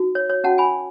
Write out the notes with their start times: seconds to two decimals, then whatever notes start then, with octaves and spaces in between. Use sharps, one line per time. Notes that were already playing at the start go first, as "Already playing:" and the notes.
Already playing: D#4 F#4
0.15 C#5
0.30 C#5
0.44 C#4 F#4 C#5 F#5 A5
0.58 G#5 B5